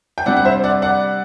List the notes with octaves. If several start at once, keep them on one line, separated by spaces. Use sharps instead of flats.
G5
C3 G3 D4 D5 F#5
F#5
C5 E5
D5 F#5
D5 F#5